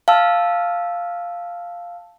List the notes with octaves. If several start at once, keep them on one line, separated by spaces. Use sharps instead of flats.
F5 A5 E6 F6